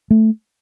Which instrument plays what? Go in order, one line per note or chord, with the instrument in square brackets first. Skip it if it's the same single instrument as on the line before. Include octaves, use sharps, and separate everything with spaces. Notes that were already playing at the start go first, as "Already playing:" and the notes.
[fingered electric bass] A3